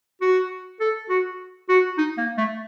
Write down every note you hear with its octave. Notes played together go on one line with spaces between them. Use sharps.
F#4
A4
F#4
F#4
D#4
A#3
A3